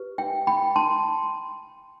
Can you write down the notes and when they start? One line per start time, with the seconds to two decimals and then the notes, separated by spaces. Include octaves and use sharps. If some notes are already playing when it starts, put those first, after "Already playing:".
Already playing: G4 B4
0.18 E5 G5
0.47 G5 B5
0.76 A5 C6